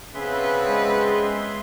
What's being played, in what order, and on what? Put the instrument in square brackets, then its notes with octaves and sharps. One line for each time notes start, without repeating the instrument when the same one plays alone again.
[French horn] C#3 [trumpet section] B3 C4 B4 [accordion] G#4 E5 C6
[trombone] G#3